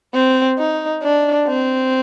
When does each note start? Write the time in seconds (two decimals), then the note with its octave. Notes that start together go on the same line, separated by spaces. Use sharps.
0.14 C4
0.59 D#4
1.03 D4
1.48 C4